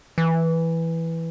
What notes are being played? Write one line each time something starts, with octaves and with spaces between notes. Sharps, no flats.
E3